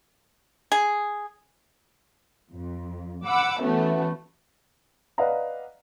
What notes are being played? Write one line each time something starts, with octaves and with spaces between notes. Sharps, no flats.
G#4
F2
F#5 B5 D6 E6
E3 A3 B3 C#4 F#4
B4 D5 D#5 F5 F#5 A#5